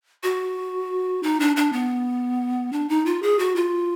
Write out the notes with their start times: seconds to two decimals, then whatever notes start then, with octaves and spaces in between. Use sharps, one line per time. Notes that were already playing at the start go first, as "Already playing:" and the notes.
0.23 F#4
1.23 D#4
1.40 D4
1.56 D4
1.73 B3
2.73 D4
2.89 D#4
3.06 F4
3.23 G#4
3.39 F#4
3.56 F4